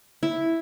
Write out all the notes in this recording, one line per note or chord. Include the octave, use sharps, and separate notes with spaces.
E4